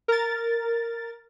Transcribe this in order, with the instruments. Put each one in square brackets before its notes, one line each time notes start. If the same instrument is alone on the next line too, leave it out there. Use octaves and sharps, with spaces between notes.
[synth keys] A#4 A6